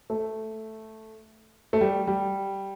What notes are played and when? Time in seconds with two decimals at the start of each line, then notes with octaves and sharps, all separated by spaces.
0.10 A3
1.73 A3
1.81 G3
2.07 G3